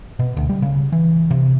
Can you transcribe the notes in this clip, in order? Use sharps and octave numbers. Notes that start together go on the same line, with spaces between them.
B2
D2
G3
C#3
E3
C3